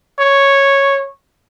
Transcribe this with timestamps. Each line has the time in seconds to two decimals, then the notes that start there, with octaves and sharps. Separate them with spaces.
0.19 C#5